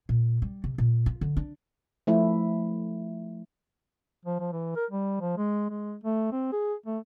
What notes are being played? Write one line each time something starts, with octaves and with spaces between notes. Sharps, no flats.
A#2
G3
C3
A#2
F4
D3
D4
F3 A3 E4
F3
F3
E3
A#4
G3
F3
G#3
G#3
A3
C4
G#4
A3